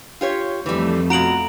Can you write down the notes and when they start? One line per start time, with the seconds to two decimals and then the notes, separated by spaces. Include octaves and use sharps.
0.21 F4 G4 C#5
0.66 F2 E3 G3 A3
1.10 B2 F4 F#4 A#5 D7 F#7